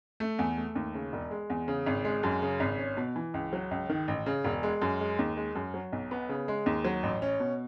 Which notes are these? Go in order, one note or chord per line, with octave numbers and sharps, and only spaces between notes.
A3
E2
A3
D#2
C#3
E1
G#3
E2
C#3
G#1
G#3
F#2
C#3
G#1
C#4
B2
E3
C#2
F#3
C#2
D#3
A1
C#3
E1
G#3
F#2
G#3
D#2
G#3
F#2
F#3
B1
B3
C#3
G#3
D#2
F#3
A1
C#4
B2